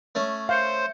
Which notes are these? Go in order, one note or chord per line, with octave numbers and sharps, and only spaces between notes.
A3 C#4
C5 E5 F5 G6 C#7